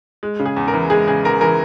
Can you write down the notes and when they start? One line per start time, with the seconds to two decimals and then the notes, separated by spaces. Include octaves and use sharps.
0.23 G#3
0.39 C#3
0.46 G#4
0.56 E2
0.68 A#4
0.74 E3
0.90 G#3 G#4
1.08 C#3 G#4
1.24 E2 A#4
1.41 E3 A#4